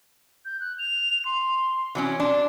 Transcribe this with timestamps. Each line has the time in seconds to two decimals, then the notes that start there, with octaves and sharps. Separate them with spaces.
0.45 G6
0.60 F#6
0.79 F7
1.25 C6
1.95 E3 F#3 C#4
2.20 D4 C6